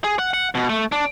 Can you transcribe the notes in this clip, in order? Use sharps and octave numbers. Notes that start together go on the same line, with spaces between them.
G#4
F#5
F#5
B2
A3
D4